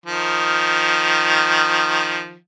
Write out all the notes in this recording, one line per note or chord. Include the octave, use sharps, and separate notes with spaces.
D#3 F3